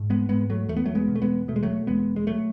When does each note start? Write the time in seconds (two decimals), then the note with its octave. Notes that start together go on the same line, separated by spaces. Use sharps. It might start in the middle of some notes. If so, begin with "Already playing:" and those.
Already playing: G#2
0.10 G#3 B3
0.29 G#2 G#3 B3
0.50 F#3 A3
0.69 E2 A3
0.77 B3
0.85 F#3 A3
0.95 G#3 B3
1.08 B2
1.16 A3
1.22 G#3 B3
1.48 B2 A3
1.56 G#3
1.63 F#3 A3
1.87 E2 G#3 B3
2.16 G#3
2.27 F#3 A3